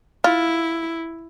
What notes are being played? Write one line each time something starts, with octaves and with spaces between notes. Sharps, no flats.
E4 F4